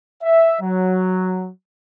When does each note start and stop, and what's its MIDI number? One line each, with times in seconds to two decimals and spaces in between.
0.23 0.58 76
0.61 1.50 54